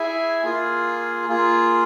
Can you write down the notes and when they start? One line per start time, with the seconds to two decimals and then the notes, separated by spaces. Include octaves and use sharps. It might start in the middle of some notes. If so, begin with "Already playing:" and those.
Already playing: E4 G#4 E5 G#5
0.43 A#3 F4 G#4
1.28 A#3 F4 G#4